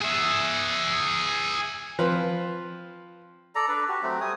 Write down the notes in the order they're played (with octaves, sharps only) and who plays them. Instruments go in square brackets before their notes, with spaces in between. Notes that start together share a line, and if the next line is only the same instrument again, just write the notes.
[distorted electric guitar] G#4 E5
[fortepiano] F3 C4 F4 B4
[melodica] A4 D5 A#5
D4 B4 D5
F#4 G4
F#3 A3 C4
G3 G#5 D#6